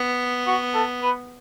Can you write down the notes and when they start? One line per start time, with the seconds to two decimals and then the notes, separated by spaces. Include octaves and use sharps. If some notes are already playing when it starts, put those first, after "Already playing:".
Already playing: B3
0.47 F#4
0.74 A4
1.02 B4